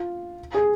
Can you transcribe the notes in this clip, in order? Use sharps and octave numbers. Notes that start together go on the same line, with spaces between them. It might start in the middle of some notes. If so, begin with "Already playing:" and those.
Already playing: F4
G#4